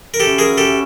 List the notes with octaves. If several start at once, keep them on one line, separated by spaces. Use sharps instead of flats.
A#4
C#4 F#4 G4 A4 B4 E5
G#4 A#4
G4 A4